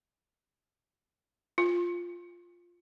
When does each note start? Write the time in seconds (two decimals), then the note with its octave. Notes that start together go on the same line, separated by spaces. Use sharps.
1.58 F4